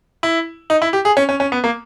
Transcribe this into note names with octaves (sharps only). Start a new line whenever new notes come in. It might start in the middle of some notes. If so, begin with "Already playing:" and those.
E4
D#4
E4
G4
G#4
C#4
C#4
C#4
B3
A#3